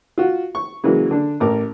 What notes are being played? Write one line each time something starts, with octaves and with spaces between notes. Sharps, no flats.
F4 F#4
C#6
C#3 E3 F#3 G#3 A#3
D3 D4
A1 A#4 D6